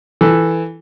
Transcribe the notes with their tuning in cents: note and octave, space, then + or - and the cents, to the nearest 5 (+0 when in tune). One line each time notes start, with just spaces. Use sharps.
E3 +0 A4 +0